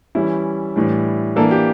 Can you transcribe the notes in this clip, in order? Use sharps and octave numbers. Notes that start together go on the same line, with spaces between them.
E3 G3 C#4 E4
A2 E3 G3 D4
E3 A#3 D4 A4
G4